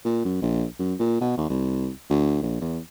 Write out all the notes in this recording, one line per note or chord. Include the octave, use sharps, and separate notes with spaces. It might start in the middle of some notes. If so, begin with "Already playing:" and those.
A#2
F#2
A#1
F#2
A#2
B2
D#2
C2
D2
A#1
E2